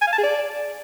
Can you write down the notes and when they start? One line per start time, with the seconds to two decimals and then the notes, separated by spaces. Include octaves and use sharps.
0.02 G#5
0.07 F5
0.13 A5
0.18 G#4
0.24 D5